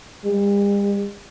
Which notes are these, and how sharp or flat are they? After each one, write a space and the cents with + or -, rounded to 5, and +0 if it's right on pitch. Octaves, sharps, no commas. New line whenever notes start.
G3 +45